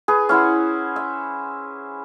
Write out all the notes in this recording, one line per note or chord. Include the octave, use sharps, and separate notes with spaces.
G#4 B4
C#4 E4 C5 F#5
E5